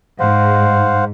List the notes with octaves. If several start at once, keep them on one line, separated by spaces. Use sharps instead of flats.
G#2 C5 F5 F#5